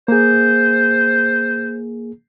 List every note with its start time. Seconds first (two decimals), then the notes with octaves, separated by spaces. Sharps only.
0.08 A#3 G#4 C5